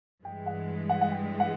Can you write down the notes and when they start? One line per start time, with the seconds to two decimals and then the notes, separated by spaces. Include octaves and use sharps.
0.25 G2 E3 G#3 G5
0.46 F#5
0.89 F#5
1.01 F#5
1.12 G5
1.40 F#5